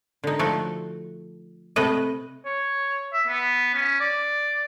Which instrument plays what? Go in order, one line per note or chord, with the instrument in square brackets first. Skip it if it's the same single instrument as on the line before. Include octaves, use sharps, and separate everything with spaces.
[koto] D3 D#4
F3 A3 F#4 A4
C3 A3 B4 D#5
[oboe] C#5
E5
B3
C#4
D5